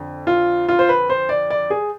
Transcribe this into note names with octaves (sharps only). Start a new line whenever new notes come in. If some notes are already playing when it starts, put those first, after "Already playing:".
Already playing: F2 D3
F4
F4
C5
B4
C5
D5
D5
G#4